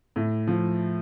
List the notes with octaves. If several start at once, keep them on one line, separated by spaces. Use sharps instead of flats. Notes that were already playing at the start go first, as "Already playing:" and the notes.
A2
F3